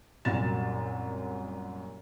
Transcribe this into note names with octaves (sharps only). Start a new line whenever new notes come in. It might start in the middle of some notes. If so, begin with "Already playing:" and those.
C2 F#2 A#2 C#4 A6 E7